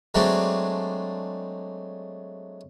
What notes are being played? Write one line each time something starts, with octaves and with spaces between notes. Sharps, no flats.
F#3 G#3 A3 C4 D4